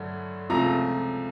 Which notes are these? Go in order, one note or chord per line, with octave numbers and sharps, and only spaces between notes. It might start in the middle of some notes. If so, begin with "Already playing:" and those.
Already playing: G2 D3 F#3 A3
C#2 C3 F3 A3 A#5